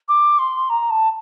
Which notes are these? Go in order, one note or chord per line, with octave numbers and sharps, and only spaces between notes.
D6
C6
A#5
A5